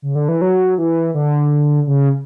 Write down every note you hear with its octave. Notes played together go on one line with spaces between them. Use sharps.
C#3
D3
E3
F#3
E3
D3
C#3